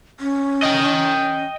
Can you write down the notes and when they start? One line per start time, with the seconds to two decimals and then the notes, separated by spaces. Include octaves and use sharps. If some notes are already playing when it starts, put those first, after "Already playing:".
0.20 C#4
0.62 D#5 G5